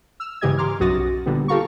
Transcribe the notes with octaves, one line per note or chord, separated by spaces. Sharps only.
E6 F6
G#2 C#3 E3 G4 D#5 G#6
A#4 C6 D6 F6
B1 F#2 F#4 D#6 A6 A#6
A#2 D3 G3 B3
F4 G4 A4 F5 A#5 C#6